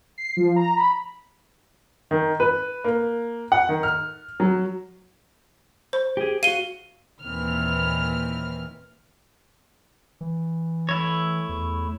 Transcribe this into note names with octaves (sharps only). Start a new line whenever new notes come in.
C7
F3
A#5
B5
D#3
B4
A#3
F#5
D#3
F6
F#3
C5
G4 G#4
F#4 F5 D#7 G7
D#2 A#2 D#3 E3 C4 F6
E3
A3 E4 C#5
E2